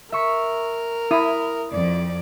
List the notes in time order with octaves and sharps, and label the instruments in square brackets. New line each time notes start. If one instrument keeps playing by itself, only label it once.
[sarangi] A#4 [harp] E5 C#6 B6
[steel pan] E4 [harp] D#6 B6
[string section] F2 [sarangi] D5